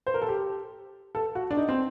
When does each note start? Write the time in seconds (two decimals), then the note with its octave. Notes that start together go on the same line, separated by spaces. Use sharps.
0.07 C5
0.14 A#4
0.22 A4
0.28 G4
1.15 A4
1.35 F#4
1.51 D4
1.57 D#4
1.69 C4